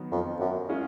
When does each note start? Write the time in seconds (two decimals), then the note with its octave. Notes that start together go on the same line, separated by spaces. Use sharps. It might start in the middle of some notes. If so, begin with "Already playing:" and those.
Already playing: D#3 F#3 B3
0.12 F2
0.40 F#2
0.69 G#3 C#4 F4